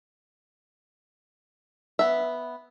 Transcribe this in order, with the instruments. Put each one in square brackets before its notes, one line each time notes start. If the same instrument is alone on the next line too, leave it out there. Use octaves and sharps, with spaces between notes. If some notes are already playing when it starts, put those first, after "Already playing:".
[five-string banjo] B3 E5